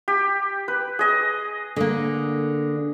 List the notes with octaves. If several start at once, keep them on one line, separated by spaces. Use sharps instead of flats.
G4
B4
G#4 D#5
D3 A#3